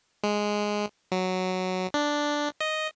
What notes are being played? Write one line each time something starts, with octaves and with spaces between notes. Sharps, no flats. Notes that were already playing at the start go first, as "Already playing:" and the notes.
G#3
F#3
D4
D#5